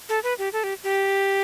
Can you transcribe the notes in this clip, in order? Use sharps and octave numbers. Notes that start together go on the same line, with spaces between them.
A4
B4
G4
A4
G4
G4